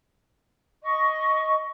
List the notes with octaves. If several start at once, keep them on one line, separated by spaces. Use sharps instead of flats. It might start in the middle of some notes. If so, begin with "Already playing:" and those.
D#5 C#6